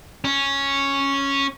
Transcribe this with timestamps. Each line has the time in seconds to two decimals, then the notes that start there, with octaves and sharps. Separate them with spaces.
0.25 C#4